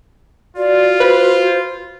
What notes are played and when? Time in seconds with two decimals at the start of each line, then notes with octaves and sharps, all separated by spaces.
0.57 F4 F#4 D5
1.00 B4 C5